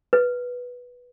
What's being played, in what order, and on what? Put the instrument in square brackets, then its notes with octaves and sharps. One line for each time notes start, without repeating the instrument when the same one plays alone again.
[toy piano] B4